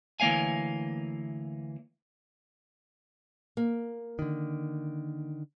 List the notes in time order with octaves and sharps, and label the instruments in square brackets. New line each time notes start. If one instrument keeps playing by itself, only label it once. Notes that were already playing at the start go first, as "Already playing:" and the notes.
[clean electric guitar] D2 E3 A#3 C#5 F5 G#5
[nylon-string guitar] A#3
[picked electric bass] D3 D#3